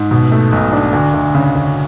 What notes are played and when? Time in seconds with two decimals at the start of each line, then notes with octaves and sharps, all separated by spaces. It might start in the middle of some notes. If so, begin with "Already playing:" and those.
Already playing: G#2
0.11 B2
0.32 A3
0.52 B1
0.73 D4
0.93 D2
1.14 D2
1.35 C#3
1.55 D2